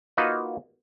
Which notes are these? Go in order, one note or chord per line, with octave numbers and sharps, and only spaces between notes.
A#3 D#4 F4 F#4 B4 D#5